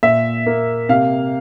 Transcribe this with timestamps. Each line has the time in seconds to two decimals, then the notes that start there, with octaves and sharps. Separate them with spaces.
0.03 A#2 E5
0.46 A#3
0.89 C3 F5